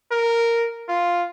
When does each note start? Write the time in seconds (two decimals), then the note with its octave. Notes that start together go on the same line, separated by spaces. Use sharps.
0.11 A#4
0.88 F4